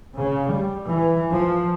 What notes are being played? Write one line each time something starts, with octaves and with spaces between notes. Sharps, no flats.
C#3
G3
E3
F3